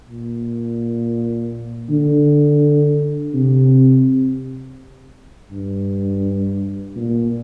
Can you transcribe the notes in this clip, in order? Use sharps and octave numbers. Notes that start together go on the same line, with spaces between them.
A#2
D3
C3
G2
A#2